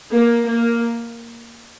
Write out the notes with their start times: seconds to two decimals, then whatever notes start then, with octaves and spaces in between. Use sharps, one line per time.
0.13 A#3
0.46 A#3